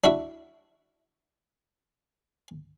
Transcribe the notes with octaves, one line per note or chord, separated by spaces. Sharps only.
D4 E4 F#4 E5